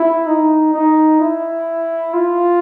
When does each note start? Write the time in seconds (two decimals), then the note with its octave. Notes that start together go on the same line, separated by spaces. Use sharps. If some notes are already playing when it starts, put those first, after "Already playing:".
Already playing: E4
0.27 D#4
0.74 D#4
1.21 E4
2.14 F4